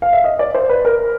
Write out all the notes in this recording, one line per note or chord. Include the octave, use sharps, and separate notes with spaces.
F5
E5
D#5
D5
C5
B4
A#4